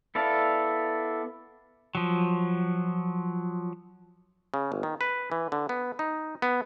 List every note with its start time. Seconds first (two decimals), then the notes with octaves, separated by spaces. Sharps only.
0.15 B3 E4 A4 D5 F5
1.95 F3 F#3
4.54 C#3
4.72 G1
4.83 D#3
5.01 B4
5.32 E3
5.52 D3
5.69 B3
5.99 D#4
6.42 B3